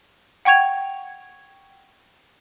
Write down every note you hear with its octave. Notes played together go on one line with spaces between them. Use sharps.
F#5 G5 C#6 G#6 F7